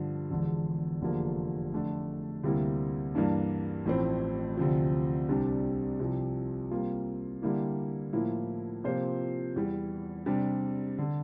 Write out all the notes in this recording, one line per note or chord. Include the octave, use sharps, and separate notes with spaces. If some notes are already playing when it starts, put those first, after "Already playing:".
Already playing: G2 D3 F3
E1 E2 D3 F3
F1 E2 D3 F3 A#3
F2 D3 A3 D4
D2 C3 G3 A#3 E4
G2 E3 A#3 D4
A1 A2 F3 C4
D2 C3 F3
C2 C3 G3 D4 G4
C2 C3 F3
C3 G3 A#3 F4
D3 G3 A#3 E4 G4
A2 F3 A#3 E4
C3 F3 A#3 F4 C5
E2 E3 G3
C3 G3 D4
D3